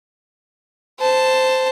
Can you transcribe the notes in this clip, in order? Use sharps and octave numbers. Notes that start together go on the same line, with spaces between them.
C5 A5